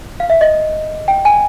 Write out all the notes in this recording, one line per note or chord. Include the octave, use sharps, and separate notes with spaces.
F5
E5
D#5
G5
G#5